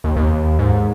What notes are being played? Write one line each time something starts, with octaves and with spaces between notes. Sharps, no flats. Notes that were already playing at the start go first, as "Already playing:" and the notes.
D#2
D#2
G#2